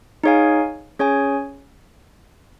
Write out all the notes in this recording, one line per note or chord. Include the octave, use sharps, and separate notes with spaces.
D#4 G#4 C#5 F5 G#5
C#4 G#4 C#5 G#5